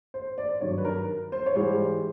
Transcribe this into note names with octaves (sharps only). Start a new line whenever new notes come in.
C5
D5
G2 D#3 F#3 C#5
B4
A#4
C5
C#5
G#2 E3 G3 C5